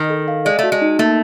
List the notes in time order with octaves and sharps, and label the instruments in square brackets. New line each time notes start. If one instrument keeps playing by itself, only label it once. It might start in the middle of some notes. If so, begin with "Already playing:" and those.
Already playing: [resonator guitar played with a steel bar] D#3
[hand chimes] A4
F5
[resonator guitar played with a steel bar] G#3 [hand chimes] D5
[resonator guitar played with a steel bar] A3 [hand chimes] F#4
[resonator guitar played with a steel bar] G#3
[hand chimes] D#4
[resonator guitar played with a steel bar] A3 [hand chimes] A#3